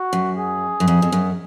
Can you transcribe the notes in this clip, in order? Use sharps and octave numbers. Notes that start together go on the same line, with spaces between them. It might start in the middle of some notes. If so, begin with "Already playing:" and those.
Already playing: F#4
F#2
G#4
F#2
F2
F2
F#2